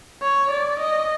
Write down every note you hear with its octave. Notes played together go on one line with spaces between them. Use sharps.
C#5
D5
D#5